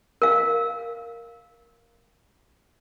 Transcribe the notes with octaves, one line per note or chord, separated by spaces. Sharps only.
A#4 F5